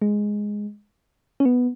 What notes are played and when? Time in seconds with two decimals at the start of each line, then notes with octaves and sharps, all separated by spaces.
0.02 G#3
1.40 C#4
1.45 B3